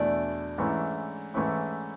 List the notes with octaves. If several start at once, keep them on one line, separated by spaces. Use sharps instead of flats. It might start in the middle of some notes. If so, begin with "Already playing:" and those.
Already playing: E2 B2 A3 D4 E4
G#2 E3 A3 C#4 E4
G#2 E3 A3 C#4 E4